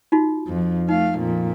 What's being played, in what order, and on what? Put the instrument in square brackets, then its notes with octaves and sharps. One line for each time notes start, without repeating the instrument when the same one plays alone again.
[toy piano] D#4 F4 F#4
[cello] F2
[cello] A3 F5 [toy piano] D#4
[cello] F2 A#2